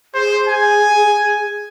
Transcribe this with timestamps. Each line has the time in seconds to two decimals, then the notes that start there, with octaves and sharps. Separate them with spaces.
0.14 G#4 C5
0.48 G#5